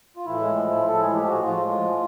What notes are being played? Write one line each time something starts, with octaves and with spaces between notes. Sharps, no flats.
F4
A2 E3 E4
G#3
F3
A2
A2 A4
G#3 G#4
F3 G4
A2 F#4
A2 F3 F4
G#3
F3
A2